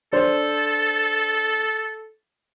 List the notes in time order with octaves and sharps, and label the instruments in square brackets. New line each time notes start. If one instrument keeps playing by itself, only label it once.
[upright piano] D4 C5 [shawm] A4